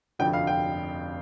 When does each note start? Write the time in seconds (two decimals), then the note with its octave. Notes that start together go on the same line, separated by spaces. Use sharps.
0.19 F1 F2 D3 F3 G5
0.33 F5
0.47 G5